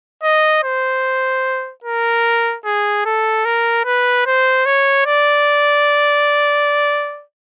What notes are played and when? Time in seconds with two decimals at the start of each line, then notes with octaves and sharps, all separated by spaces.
0.23 D#5
0.64 C5
1.84 A#4
2.65 G#4
3.05 A4
3.45 A#4
3.85 B4
4.26 C5
4.66 C#5
5.07 D5